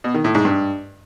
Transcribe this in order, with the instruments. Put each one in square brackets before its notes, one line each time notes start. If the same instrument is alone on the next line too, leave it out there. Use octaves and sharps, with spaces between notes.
[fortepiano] B2
D#3
A2
G#2
G2